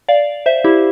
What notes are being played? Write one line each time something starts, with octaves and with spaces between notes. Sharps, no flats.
D5 F5
C5 E5
E4 G4